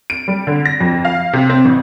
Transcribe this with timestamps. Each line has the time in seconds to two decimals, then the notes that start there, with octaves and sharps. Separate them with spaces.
0.10 D7
0.28 G3
0.47 D3
0.66 A#6
0.80 F2
1.05 F5
1.33 C3
1.49 C4
1.65 A1